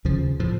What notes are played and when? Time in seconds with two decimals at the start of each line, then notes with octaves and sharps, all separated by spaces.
0.05 D#2 C#3 F3
0.40 A2 F3